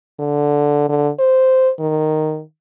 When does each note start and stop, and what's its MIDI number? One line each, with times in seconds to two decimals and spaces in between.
0.20 0.89 50
0.89 1.09 50
1.19 1.70 72
1.80 2.42 51